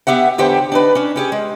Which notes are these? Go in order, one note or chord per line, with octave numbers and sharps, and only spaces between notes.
B3 G4 E5 F#5
E2 D3 G4 B4 C5 G5
D4 D#4 B4
C#4 D4
C#4 G4 G#4
G#3